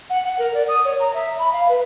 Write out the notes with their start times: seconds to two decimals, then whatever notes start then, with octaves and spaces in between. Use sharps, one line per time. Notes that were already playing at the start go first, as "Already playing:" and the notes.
0.10 F#5
0.23 F#5
0.39 A#4
0.54 D5
0.68 D#6
0.84 C#5
1.00 A#5
1.14 E5
1.39 B5
1.53 F5
1.69 B4